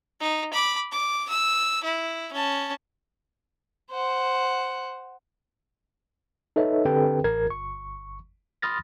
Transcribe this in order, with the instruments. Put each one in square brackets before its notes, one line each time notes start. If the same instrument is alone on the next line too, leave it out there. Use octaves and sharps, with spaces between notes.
[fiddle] D#4
B5 D6
D6
E6
E4
C#4 A5
[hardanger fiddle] C5 F#5
[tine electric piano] D#4 A4 B4 C#5 D#5 E5
D3 C4 G4 A4 B4 G5
A1 A#4 G#6
G1 C#6
B5 C6 D#6 F6 A6 A#6